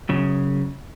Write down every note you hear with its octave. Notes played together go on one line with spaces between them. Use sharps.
F#2 C#3